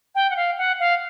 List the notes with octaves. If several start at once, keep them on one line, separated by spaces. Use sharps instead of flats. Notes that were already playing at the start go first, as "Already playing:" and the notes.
G5
F#5
F5
F#5
F5